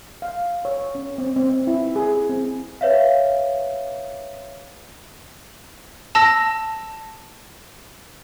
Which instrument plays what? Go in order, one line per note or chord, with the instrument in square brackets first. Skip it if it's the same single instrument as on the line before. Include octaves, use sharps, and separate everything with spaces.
[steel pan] F5
C#5
C#4
C4
C4
E4
G#4
C4
[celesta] B4 C#5 E5 F5
[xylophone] A5 E6 A#6